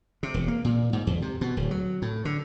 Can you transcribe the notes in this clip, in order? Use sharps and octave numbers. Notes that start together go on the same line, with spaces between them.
C3
E1
A#3
A#2
G#2
E2
C3
B2
D1
F#3
A2
D3